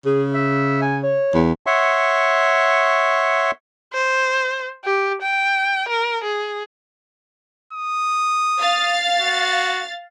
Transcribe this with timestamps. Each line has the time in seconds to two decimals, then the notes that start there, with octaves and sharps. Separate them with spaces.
0.05 C#3 G#4
0.34 E5
0.82 G#5
1.03 C#5
1.34 E2
1.66 C#5 E5 F#5 C6 C#6
3.94 C5
4.84 G4
5.22 G5
5.89 A#4
6.24 G#4
7.73 D#6
8.60 F5 A6
9.21 F#4